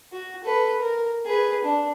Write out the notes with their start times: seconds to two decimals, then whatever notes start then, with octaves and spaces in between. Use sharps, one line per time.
0.12 F#4
0.44 A4 B4
0.79 A#4
1.25 G#4 B4
1.64 D4